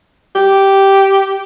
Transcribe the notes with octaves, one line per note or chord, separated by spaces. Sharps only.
G4